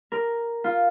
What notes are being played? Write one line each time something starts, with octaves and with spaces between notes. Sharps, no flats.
A#4
F4